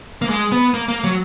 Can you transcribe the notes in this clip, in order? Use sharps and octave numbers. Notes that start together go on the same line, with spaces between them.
A#3
G#3
B3
A#3
A#3
F#3